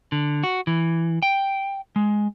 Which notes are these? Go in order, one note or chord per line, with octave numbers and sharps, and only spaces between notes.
D3
F#4
E3
G5
G#3